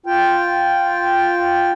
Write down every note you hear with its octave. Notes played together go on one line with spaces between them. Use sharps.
F4 G5